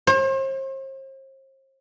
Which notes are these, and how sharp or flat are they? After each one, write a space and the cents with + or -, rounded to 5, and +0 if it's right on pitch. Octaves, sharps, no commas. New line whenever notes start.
C5 +40